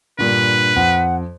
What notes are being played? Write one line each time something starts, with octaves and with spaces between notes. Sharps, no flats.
G2 A#2 D3 B4
F2 F#5